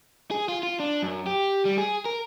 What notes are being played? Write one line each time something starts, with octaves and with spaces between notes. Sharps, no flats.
G#4
F4
F4
D4
F#2
G4
G3
G#4
A#4